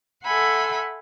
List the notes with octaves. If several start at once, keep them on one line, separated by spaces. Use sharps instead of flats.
A4 E5 F#5 G#5 B5 C6